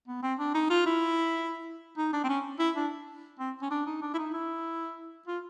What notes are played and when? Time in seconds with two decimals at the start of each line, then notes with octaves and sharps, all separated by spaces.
0.08 B3
0.23 C4
0.39 D4
0.54 D#4
0.70 F4
0.86 E4
1.97 D#4
2.13 D4
2.24 C4
2.29 C#4
2.59 E4
2.76 D4
3.39 C4
3.62 C#4
3.71 D4
3.86 D#4
4.01 D4
4.14 E4
4.18 D#4
4.34 E4
5.28 F4